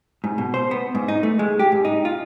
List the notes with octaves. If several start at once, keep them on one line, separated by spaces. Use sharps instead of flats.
G#2
B2
C5
B3
G#2
D#4
A3
G#3
G4
G#2
D#4
F4